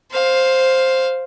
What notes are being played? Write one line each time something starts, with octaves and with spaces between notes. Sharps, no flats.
C5 F5